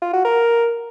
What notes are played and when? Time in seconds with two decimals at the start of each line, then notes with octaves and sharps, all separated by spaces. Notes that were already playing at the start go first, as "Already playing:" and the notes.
0.02 F4
0.13 F#4
0.25 A#4